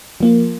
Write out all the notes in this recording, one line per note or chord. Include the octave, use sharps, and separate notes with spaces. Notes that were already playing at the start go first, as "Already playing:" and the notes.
F3 A#3 F4